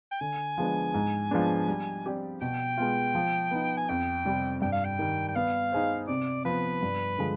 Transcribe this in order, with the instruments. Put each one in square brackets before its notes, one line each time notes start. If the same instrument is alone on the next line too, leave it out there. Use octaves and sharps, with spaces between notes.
[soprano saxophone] G5
[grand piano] D3 [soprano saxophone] G#5
[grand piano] F3 G#3 B3 D4
G#2
F3 G#3 B3 D4
G3
C4 G4 D5
[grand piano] B2 [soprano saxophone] G5
[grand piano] G#3 B3 F4
F3
B3 D#4
[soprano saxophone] G#5
[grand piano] F2 [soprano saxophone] G5
[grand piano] C3 G3 C4 G4
[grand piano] G2 [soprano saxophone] G5
[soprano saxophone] F5
G5
[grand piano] D#3 G3
[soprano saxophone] G5
[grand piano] B3 [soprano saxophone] F5
[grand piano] D#4 G#4 C5
[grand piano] C3 [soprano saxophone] D5
[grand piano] F3 B3 [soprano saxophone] B4
[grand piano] G2
D3 F3 G#3